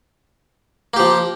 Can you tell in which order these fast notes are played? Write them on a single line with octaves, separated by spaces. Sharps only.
A#3 G4 F3